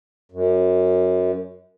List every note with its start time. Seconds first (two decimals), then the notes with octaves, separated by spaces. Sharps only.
0.32 F#2